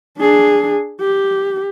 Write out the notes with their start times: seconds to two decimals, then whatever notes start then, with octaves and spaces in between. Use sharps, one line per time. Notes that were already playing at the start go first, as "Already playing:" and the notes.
0.19 D4 G#4
1.00 G4